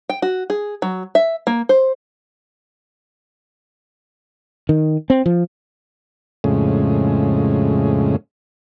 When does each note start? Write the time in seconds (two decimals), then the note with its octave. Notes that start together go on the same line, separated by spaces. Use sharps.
0.10 G5
0.22 F#4
0.50 G#4
0.82 F#3
1.15 E5
1.47 A#3
1.69 C5
4.69 D#3
5.10 C4
5.26 F3
6.44 F2 A2 C#3 G#3